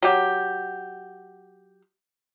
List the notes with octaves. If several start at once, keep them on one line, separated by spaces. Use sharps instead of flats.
F#3 G4